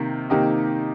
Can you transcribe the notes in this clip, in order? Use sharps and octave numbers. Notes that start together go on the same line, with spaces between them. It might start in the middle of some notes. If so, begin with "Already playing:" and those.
Already playing: C3 D#3 A#3
C3 D#3 A#3 D#4 G4